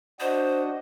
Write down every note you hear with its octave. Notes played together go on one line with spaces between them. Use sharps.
D4 F#4 C5 D#5